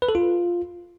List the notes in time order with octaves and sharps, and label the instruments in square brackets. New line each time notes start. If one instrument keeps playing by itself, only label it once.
[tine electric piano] B4
A4
F4